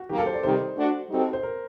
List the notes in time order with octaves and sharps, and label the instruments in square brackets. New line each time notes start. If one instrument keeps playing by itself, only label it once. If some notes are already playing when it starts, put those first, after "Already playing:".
Already playing: [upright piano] F#4
[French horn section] D#3 F#3 A#3 [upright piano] G4
[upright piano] A4
C5
D5
[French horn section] C3 D#3 G3 [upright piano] C5
[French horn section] A3 D4 F#4
G3 C4 D#4 F#4 A4
[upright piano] C5
A#4